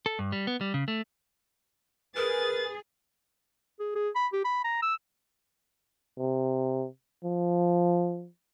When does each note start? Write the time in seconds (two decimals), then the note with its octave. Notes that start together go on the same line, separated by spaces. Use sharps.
0.06 A4
0.19 G2
0.32 G3
0.47 B3
0.61 G3
0.74 C#3
0.88 A3
2.16 G#4 A#4 B4 A6
3.80 G#4
3.95 G#4
4.15 B5
4.33 G4
4.45 B5
4.64 A#5
4.82 E6
6.18 C3
7.24 F3